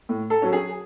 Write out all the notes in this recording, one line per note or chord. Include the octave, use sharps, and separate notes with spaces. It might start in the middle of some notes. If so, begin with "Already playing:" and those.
A2
A4
F#3 C#4
G#4